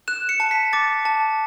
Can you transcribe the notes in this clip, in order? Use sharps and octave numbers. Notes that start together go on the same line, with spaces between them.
F#6 E7
C#7
A5
B6
D6 A6
A5